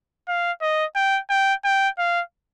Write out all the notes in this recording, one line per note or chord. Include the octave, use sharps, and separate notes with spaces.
F5
D#5
G5
G5
G5
F5